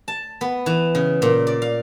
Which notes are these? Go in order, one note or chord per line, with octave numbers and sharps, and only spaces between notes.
A5
B3
E3
C#3
A#2
D5
F5